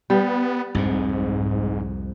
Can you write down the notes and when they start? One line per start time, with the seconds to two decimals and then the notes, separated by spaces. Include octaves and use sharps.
0.10 G3 B3
0.75 C2 F2 G#2 C3